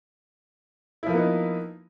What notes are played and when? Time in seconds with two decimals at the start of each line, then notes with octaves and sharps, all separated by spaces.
1.03 E4
1.06 F3
1.10 A#3
1.14 B3
1.17 D#4